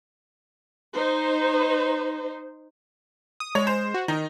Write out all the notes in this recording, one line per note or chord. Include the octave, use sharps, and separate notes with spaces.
D#4 C5
D#6
G#3 C#5
C5
F#4
D#3 D#4